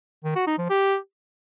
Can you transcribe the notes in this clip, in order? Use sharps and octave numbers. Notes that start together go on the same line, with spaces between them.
D#3
F#4
D#4
F3
G4